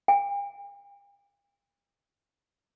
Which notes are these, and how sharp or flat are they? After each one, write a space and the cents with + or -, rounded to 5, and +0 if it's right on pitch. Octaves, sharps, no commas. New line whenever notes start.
G5 +45